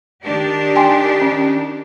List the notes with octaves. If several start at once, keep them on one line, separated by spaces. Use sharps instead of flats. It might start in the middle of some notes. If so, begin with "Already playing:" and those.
D#3 D4 G4
G5 G#5 C6
C#4